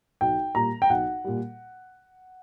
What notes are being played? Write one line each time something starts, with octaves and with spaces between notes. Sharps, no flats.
B1 G5
A#2 G3 A#5
G5
B1 F#5
A#2 G3